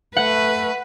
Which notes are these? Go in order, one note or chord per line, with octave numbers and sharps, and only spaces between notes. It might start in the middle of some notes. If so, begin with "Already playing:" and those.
A3 B4 F#5